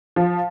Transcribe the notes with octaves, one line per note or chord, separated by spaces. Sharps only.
F3